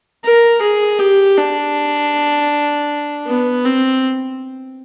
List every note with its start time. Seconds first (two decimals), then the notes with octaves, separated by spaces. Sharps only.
0.24 A#4
0.62 G#4
0.99 G4
1.37 D4
3.27 B3
3.65 C4